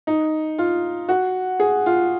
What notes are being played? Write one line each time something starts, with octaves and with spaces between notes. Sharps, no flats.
D#4
F4
F#4
G#4
F4